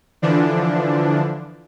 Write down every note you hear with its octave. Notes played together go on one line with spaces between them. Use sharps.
D3 E3 F3 D4